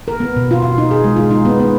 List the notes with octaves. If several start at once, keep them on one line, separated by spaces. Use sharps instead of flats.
A#4
B3
B2
F4
F4
D#4
G#4
G#3
F4
D#4
B3
B3